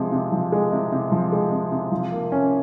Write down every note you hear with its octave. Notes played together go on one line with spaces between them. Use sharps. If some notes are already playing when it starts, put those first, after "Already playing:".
Already playing: C3 F3 G#3
C3
F3
G#3
C3
C3
F3
G#3
C3
C3
F3
A#3
C#4